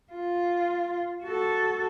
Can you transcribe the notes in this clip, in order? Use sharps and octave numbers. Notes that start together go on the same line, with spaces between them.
F4
F#4 A4